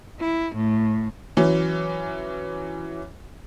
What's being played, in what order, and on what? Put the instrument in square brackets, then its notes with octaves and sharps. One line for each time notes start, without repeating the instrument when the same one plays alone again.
[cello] E4
A2
[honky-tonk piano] E3 F#3 C#4